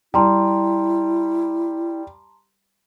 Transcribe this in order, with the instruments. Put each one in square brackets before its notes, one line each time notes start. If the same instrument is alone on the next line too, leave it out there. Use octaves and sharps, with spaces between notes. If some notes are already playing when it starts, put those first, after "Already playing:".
[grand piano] G3 [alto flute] E4 [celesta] A5 A#5 C6